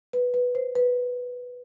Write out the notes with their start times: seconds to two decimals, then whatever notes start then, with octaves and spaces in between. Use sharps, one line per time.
0.13 B4
0.34 B4
0.55 C5
0.75 B4